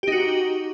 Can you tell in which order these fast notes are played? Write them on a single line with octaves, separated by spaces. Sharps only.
G4 D#4 F#4